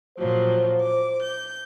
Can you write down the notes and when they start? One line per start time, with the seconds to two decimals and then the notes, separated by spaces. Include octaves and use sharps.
0.18 A#2 F3 F#3 C5
0.80 D6
1.22 G6